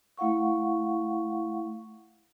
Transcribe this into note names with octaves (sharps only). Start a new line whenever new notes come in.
A3 E4 F5 F#5 C#6